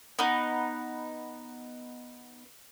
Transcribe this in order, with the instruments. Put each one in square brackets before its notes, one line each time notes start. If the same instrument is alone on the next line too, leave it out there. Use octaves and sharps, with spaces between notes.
[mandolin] B3 D#4